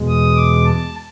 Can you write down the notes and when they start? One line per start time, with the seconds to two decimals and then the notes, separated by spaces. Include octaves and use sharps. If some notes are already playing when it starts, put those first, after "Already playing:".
Already playing: E2 B2 G#3
0.08 D#6
0.36 D6
0.65 A5